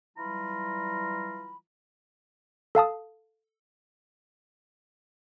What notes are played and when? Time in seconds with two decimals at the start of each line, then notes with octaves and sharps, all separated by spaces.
0.17 E3 F#3 G3 F4 A#5 B5
2.75 A4 F5 A5 D#6